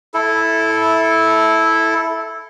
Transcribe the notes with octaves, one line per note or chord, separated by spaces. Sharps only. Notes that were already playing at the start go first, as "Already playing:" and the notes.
E4 A4